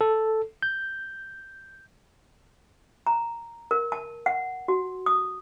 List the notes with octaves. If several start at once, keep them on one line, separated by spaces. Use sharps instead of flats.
A4
G6
A#5
A#4
A5
F#5
F#4
D#6